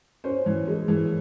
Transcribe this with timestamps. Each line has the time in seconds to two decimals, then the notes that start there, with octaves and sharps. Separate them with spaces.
0.24 C#4 C5
0.46 E3
0.67 G#3
0.88 E3